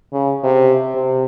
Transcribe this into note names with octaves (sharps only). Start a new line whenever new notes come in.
C#3
C3
C3